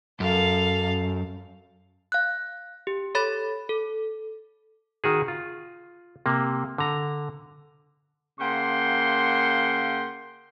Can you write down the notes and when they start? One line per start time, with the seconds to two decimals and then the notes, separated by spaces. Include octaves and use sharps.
0.20 F#2 A4 F5
2.12 F5 F#6
2.87 G4
3.15 A4 C#5 B5 A6
3.69 A4
5.04 D#3 F#4 G#4
5.28 F4
6.26 C3 A#3
6.78 D3 A#5
8.40 C#3 A#3 F#5 G5 C6